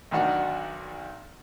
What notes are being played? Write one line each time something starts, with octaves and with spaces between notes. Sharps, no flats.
B1 D#3 D4 F#4 F#5